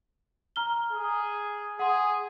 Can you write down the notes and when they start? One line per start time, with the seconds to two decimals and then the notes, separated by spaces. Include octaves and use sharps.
0.56 A#5 F6 G7
0.92 G#4
1.79 G#4 F#5 C6